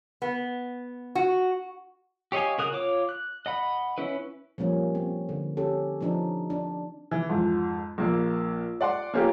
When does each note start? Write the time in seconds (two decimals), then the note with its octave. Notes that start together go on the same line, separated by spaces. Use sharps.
0.22 B3
1.15 F#4
2.32 G4 C#5 D#5 F5 G#5
2.58 C#3 F#4 A#4 D#6 F#6
2.73 F4 C#5 D6
3.09 F#6
3.46 D#5 F#5 B5
3.98 C#4 E4 B4
4.58 F3 G3 A#3 C#4
4.95 C4
5.29 D3
5.57 C#4 G4 A4
6.01 F3 C4 D4 D#4
6.50 D4
7.11 E3
7.29 F2 G#2
7.98 A#1 A#3
8.81 D5 F#5 C6
9.14 A#3 C#4 F4 G4 A#4